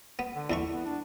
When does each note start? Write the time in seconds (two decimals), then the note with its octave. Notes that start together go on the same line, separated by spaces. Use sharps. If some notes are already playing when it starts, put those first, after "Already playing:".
0.19 B3
0.34 D3
0.50 E2 E3 E4 C#6
0.73 B3
0.85 D4